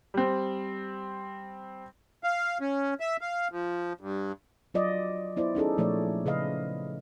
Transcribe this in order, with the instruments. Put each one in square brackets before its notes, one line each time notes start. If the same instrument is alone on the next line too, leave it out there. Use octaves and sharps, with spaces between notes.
[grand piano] G3 C4
[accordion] F5
C#4
E5
F5
F3
G2
[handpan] F#3 F4 D5 D#5
B3 E4 C5 D5
C#4 D#4 G#4 A4
A#2 F3 A3 C#5 D5
C#3 B4 D#5 F5